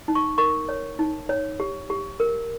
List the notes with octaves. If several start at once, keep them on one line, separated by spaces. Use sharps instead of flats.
D#4
C#6
A#4 C#6
C#5
D#4
C#5
G4
G4
A#4